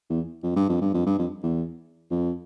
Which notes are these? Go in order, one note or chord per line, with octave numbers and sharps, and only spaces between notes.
E2
F2
G2
F2
G2
F2
G2
F2
E2
F2